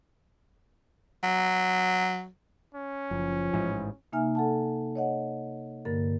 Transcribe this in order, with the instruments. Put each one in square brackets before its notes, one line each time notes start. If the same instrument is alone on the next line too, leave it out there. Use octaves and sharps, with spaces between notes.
[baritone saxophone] F#3
[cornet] C#4
[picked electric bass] F#1 [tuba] F3
[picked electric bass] A1 G#2 E3
[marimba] C3 A#3 D#4 E5 G#5 F6
A4 F#5 A5
C#5 D#5 F#5
G2 D3 A#3 A#4 A6